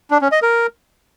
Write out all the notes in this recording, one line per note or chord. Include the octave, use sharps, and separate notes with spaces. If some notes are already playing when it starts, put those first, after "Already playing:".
D4
C#4
D#5
A#4